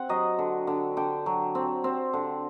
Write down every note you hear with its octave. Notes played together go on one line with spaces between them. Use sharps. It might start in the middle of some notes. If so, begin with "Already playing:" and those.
Already playing: C4 F#5
F#3 D#5
D3
D3
D3 G5
F#3
C4
C4
D3